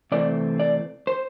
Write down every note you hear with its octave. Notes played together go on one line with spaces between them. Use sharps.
C3 E3 A3 C4 D5
D5
C5